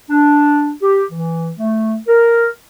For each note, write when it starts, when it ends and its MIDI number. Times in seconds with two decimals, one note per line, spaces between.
0.10 0.72 62
0.82 1.05 67
1.12 1.51 52
1.58 1.97 57
2.08 2.47 70